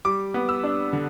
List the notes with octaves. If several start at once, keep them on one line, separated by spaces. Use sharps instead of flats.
G3 D6
B3
E6
D4
D3